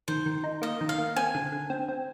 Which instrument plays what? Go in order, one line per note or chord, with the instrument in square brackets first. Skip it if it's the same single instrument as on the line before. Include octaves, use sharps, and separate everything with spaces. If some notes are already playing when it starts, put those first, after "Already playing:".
[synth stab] D#3 [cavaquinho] C5
[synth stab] D#3
D#4
[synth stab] A#3 [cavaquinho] D#5
[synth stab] D#3
[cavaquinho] F5
[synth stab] A#3
[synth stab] C4 [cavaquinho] G#5
[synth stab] D3
D3
C4
C4